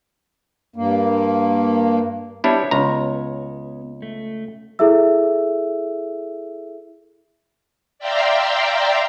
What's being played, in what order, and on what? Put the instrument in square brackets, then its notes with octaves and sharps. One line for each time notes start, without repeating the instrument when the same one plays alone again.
[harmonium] G2 A#3
[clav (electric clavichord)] G3 D4 E4 [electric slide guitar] B3 C#5
[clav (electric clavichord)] C#2 A#5
[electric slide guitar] A3
[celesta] E4 G#4 A4 E5 E6
[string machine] D5 E5 F5 G5 A#5 C6